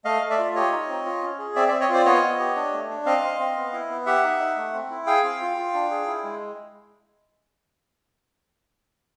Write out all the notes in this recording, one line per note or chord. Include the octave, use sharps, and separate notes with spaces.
A3 D#5 F5
A3
D5 E5
F4
G4 C#5 D#5
D#4
C4
F4
C#4
G#4
C4 D5 E5
D5 E5
C4
C#5 D#5
F4 C5 D5
B3 C#5 D#5
B3
G4
D4
A3
D4
C4 D#5 F5
C4
C4
B3
E4
B3
G4 E5 F#5
D#4
D#4
A3
C4
E4
G#4 F5 G5
C4
F4
F4
D4
G#4
E4
G#3